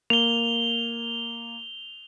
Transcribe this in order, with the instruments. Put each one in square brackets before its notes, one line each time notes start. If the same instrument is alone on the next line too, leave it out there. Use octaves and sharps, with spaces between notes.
[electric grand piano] A#3 [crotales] F7 G7